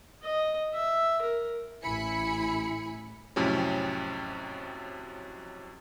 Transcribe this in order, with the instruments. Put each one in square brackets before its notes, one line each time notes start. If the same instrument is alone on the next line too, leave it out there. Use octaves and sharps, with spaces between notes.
[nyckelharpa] D#5
E5
A#4
[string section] A1 E4 G#5 B5 C#7
[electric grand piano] F2 A2 C3 F#3 C4 C#4